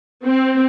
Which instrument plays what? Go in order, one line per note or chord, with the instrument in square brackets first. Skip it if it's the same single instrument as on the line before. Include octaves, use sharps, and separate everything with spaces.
[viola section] C4